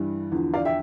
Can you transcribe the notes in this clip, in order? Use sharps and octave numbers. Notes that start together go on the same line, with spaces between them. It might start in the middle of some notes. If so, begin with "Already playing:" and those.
Already playing: G2 E3 G3
E2 D3 F3
D5 F5
E5 G5